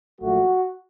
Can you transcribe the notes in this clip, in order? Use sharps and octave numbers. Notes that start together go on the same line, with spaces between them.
A#1 A#2 F#3 A3 F#4